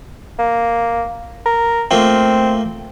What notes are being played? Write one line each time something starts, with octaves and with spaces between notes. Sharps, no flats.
A#3
A#4
A3 A#3 C4 F4